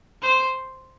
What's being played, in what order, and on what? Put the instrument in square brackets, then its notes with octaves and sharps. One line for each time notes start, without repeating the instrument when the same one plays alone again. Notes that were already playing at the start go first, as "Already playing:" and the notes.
[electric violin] C5